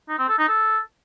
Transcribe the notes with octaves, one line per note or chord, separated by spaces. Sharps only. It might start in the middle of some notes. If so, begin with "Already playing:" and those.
D#4
C4
A4
D#4
A4